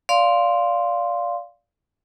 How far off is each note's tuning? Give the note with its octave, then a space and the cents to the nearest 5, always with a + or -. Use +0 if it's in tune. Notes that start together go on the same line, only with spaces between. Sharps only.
D5 -15 F5 +0 C6 +0